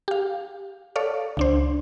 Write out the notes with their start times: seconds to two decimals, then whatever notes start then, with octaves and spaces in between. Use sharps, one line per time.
0.08 G4 F5
0.96 A4 C#5 D5 F5
1.37 C#2 D4 C5